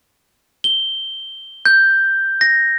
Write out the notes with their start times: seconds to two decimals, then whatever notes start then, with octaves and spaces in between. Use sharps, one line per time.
0.64 G7
1.66 G6
2.41 A#6